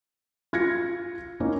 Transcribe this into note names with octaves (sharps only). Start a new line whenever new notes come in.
F4 G#6 A#6 C#7
A#3 C#4 D#4 E4